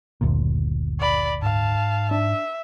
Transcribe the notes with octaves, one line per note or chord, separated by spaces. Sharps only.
F#1 D2 A#2
D5 B5
G#2 F5 A5
D4 E5